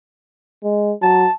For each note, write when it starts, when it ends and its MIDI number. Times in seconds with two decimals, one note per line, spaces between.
0.64 0.93 56
1.02 1.26 54
1.02 1.33 81